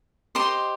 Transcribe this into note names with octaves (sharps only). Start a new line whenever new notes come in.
G4 C5 D#5 C6